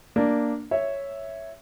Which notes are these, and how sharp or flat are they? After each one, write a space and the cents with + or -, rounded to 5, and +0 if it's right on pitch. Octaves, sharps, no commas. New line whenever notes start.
A#3 +0 D4 +0
C#5 +0 E5 +0